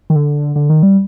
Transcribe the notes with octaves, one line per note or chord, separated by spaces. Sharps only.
D#3
D3
D3
D#3
G3